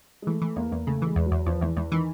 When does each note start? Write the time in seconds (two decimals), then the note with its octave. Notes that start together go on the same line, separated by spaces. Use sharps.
0.22 G#3
0.27 E3 A3
0.42 E3 A3
0.56 E2 A#3
0.72 E2 A#3
0.87 C#3 A3
1.02 E3 G#3
1.16 E2
1.26 F#3
1.32 E2
1.46 E2 F3
1.61 E2 E3
1.77 E2 E3
1.92 D#3 E3